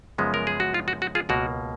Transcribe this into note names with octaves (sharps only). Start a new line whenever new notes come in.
F#2 C#3 F3 G#3 B3
A#4
G#4
F#4
F4
F#4
F#4
F4 G#4
C#2 B2 A#3 F#4 A#4